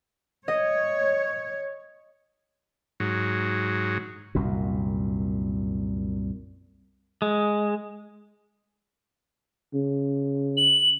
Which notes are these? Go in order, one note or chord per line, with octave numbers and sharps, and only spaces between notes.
C#5 D#5
G#2 F#3
C2 F#2 A#2
G#3
C#3
F#7